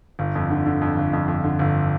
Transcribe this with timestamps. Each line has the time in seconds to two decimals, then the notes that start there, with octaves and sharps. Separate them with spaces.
0.19 G1
0.35 F2
0.50 D3
0.66 D3
0.81 F2
0.97 G1
1.13 F2
1.28 F2
1.44 D3
1.59 G1